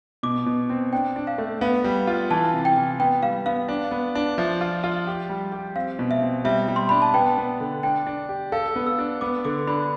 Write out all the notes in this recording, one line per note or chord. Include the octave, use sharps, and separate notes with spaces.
B2 D6
B2
C4
D4 G5
D4
F5
A3
B3 F5
G3
F4
E3 A5
C3
G5
E3
B3 G5
G3 F5
B3 F5
D4
B3
D4
F3 E5
F4
F4
G4
G3
G4
C4 F5
B2
E5
C4
G3 E5
G3
C6
D4 B5
A5
B3 G5
B3
D3
D4 G5
D4
G4
A4 F5
B3
E6
D4
B3 D6
D3 D6
D4 B5